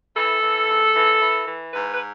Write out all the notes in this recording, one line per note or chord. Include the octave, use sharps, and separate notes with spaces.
E3 A4
E3
G#2
E3
E3
E3
G#2 B4
B4